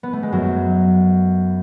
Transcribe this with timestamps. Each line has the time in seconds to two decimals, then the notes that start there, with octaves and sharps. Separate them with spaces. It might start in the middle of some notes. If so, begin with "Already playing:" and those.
0.03 B3
0.13 A3
0.23 G#3
0.32 F#2 F#3